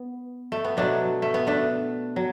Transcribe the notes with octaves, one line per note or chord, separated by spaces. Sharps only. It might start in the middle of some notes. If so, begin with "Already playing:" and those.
Already playing: B3
A3
B3
B2 F#3 A3 D4
A3
B3
A3 D4
F#3